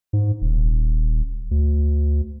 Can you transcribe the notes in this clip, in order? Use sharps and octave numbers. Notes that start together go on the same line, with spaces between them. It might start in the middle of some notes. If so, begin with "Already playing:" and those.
G#2
D#1
D2